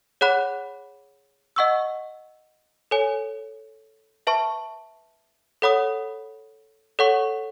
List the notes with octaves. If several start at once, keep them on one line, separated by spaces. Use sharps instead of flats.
G#4 C#5 F#5 B5 F#6
D#5 F#5 C#6 E6
A4 C#5 G#5
B4 E5 A5 C#6
A4 C#5 F#5 B5 D#6
A4 C#5 F#5 C#6